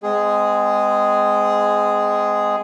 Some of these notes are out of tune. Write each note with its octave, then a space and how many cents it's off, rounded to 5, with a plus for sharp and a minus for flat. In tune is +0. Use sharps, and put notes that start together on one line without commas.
G#3 +0 C4 -35 G#4 +0